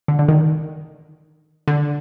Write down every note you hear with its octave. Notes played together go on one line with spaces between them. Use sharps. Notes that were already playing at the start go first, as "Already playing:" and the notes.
D3
D3
D#3
D3